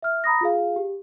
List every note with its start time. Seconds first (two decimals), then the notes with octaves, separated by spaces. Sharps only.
0.02 E5 F6
0.24 A#5 B5 D#6 A#6
0.41 F4 G#4 F5
0.76 G4